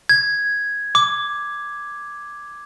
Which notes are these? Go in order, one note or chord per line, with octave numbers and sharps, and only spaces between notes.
G#6
D6